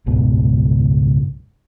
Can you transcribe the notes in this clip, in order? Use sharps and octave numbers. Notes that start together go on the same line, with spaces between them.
F#1 C#2 G#2 B2